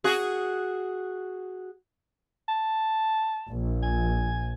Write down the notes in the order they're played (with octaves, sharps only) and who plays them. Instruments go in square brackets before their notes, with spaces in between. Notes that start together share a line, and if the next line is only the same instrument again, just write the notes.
[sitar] F#4 G#4
[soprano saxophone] A5
[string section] A#1
[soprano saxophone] G#5